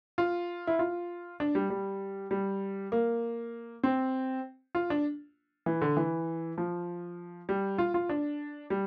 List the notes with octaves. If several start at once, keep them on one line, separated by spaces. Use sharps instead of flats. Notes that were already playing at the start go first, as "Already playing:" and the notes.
F4
E4
F4
D4
G3
G3
G3
A#3
C4
F4
D4
E3
D3
E3
F3
G3
F4
F4
D4
G3